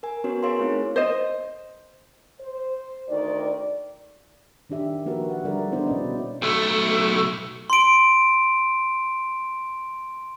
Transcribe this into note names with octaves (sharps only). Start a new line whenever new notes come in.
A#4 G#5
B3 C#4 F#4 A#4 B4 C#5
G#4 A#4 C#5 F5 G#5 C6
A3 C4 D#4 E4 G#4
C5 D#5
C5
D2 D#3 D5
D#3 D4 G4 E5
F3 A#3 F#4 A#4 B4
F#5
D3 G3 G#4 A#4 D5 E5
B3 D4 E4 C5
B2 C#4 D5 D#5
B1 A3
C6 D7